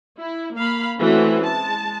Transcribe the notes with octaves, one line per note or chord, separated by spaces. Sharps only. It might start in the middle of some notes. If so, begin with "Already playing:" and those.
E4
A#3 F5 B5
E3 A3 C4 C#4 E4 F#4
G#3 A5